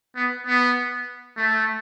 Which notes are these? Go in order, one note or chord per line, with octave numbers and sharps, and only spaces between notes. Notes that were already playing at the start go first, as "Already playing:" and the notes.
B3
B3
A3